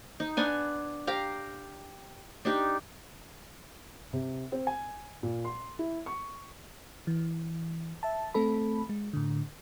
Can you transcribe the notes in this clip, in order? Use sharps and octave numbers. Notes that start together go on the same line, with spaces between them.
D#4
B3 D4 G#5
G4 F5 G5 A#5
D4 D#4 G4
C3
C4
G#5
A#2
C6
E4
C#6
E3
E5 A5
A3 C4 A4 B5
G#3
A2 D3